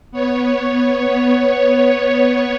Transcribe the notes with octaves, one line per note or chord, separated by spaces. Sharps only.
B3 C#5